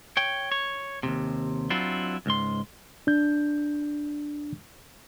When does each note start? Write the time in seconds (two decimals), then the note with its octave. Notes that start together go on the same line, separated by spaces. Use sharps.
0.17 C#5 G5
0.52 C#5
1.03 D#2 G#2 C3
1.70 F#3 C4 D4 E4 F4
2.26 C#2 G#2 C6
3.07 D4 G6